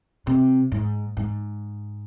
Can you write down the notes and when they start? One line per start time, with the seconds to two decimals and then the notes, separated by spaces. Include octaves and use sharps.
0.27 C3
0.72 G#2
1.17 G#2